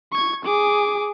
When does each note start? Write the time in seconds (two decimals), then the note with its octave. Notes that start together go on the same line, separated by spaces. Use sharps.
0.12 C#6 G#6
0.45 G#4 D6